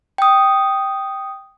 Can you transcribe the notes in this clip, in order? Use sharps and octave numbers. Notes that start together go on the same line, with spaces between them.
G5 D#6